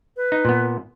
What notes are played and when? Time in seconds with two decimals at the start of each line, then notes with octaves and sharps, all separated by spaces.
0.17 B4
0.32 D#4
0.45 A#2 B3